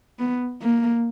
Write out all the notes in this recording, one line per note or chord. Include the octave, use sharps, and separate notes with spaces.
B3
A#3